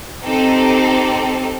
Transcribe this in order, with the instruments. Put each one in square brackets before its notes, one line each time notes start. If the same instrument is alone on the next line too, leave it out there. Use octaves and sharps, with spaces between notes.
[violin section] C4 D#4 G4 A4